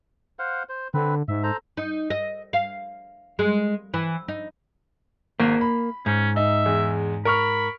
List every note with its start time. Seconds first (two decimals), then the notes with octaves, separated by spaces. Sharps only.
0.39 C5 F5 F#5
0.69 C5
0.94 D3 C4 B4
1.28 G#2 E5
1.43 A4 C5 A#5
1.77 D#4
2.10 D#5
2.53 F5
3.39 G#3
3.94 E3
4.28 D#4
5.40 G#1 A#3
5.61 B5
6.06 G#2 C#4
6.36 D#4 E5
6.66 E2 G#3
7.25 A#4 B5 C#6 F6